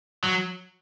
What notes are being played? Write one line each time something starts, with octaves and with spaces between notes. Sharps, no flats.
F#3